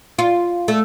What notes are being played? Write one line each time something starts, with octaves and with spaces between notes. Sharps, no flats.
F4
A3